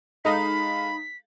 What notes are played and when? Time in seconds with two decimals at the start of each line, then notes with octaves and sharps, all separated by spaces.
0.25 G#3 D#4 A4 F5 B5 B6